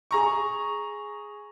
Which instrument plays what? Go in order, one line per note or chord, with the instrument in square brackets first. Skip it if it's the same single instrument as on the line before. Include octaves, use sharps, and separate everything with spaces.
[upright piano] G#4 A#5 C#6